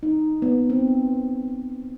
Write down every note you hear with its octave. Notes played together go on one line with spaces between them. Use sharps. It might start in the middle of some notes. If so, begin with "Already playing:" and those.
D#4
B3
C4